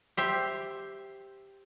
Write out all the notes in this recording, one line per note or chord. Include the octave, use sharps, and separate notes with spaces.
G4 C5 E5